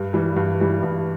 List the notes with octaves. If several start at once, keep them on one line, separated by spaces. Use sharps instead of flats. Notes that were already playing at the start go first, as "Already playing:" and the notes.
Already playing: G2
E3 G3
G2
E3 G3
G2